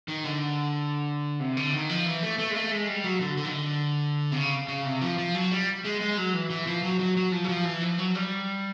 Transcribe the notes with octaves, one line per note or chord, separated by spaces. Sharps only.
D#3
D3
C3
D3
D#3
F3
E3
A3
A3
G#3
A3
G#3
G3
F#3
D3
D3
D#3
D3
C3
C#3
C#3
C3
F3
F3
F#3
G3
G#3
G#3
F#3
E3
E3
F3
F#3
F#3
F#3
F3
F#3
F3
E3
F3
F#3
G3